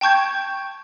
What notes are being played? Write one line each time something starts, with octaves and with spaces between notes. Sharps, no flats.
G5 A5 C#6 G6 G#6